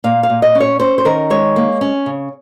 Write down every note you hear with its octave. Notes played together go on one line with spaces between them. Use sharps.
A#2 F5
F5
A#2
D#5
C#4
C#5
C#4 C5
C5
D#3 A#4
G#3 C#5
A#3
C#4
C#3